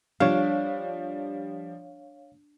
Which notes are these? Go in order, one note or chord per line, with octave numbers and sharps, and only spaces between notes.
F3 G3 D4 C#5 F5